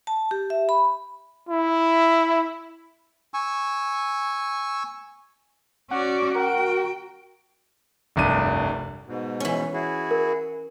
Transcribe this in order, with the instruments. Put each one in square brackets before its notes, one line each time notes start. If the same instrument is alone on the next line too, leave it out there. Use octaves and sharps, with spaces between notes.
[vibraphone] A5
G4
E5
B5
[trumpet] E4
[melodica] G#5 C#6 E6
[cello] C#4 D5 [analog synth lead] F#4
[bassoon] A#4 [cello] G5
[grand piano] F1 C2 G2 D#7
[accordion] G#2 B2
[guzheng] E3 C#4
[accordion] E4 F#4 G#4
[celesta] A#4